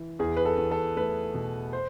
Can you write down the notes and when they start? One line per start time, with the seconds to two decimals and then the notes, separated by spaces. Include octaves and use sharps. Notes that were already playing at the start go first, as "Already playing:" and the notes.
Already playing: E3
0.19 E2 G#4
0.37 B4
0.45 A4
0.58 E2
0.71 A4
0.97 A3 B4
1.34 B2
1.73 C5